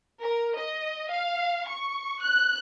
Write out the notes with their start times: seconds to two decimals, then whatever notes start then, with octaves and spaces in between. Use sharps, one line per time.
0.20 A#4
0.56 D#5
1.10 F5
1.67 C#6
2.21 F#6